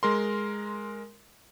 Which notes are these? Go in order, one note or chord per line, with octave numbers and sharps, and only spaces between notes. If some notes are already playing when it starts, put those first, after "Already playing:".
G#3 A#4 C6